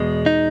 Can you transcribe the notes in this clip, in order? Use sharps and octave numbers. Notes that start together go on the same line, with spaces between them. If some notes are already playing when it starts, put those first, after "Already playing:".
Already playing: E2 B2 G#3
D#4